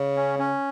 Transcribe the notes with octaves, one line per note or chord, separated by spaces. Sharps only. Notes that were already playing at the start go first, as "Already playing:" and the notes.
Already playing: C#3
C#4
C#4